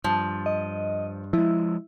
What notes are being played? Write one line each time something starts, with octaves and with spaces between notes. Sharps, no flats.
G2 F3
D#5
F3 G#3 E4